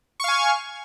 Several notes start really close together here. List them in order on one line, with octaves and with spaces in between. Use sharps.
C#6 F5 G#5